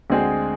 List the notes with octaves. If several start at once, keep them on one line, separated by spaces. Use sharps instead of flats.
D2 D3 G#3 C4 G#4